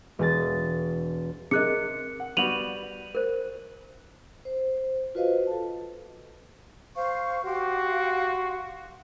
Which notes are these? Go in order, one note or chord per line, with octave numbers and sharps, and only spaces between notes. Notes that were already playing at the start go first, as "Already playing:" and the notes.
E1 G#4 A6
C3 G#4 A#4 D#5 F#6 C#7
F#5
G3 B3 F#4 D#7 F7 F#7
A#4 C5
C5
F4 F#4 B4 C5 D#5 F5
A4 A5
C5 F5 C#6
F#4 G4 F5 C6